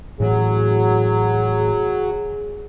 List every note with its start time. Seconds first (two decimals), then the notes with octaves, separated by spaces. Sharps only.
0.20 A2 E3 F#3 G#4